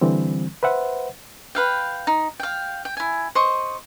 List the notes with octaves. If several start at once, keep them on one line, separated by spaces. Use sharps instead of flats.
D3 E3 G3 C4
B4 C5 E5 F#5
B4 F5 G5
D#4
F5 G5
G5
E4 G#5
C5 D#5 C#6